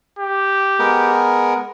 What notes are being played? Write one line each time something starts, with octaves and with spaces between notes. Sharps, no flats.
G4
G#3 B3 A#4